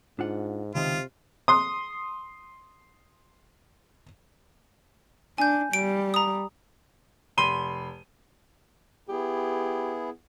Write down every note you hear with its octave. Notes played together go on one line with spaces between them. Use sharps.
G#2 D4 F4 F#5
C#2 C3 D#3 F4
C6 D#6
D4 G#5 G6
G3 D7
A#5 D#6
F1 B5 C6 D#7 G7
B3 E4 G4 G#4